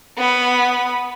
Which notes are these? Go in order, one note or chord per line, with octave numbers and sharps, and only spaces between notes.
B3 B5